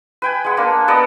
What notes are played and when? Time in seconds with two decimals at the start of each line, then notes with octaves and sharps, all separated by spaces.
0.22 B4 G5 G#5
0.44 G#3 F#5
0.57 A#3 D4
0.88 B3 A4 D5 D#5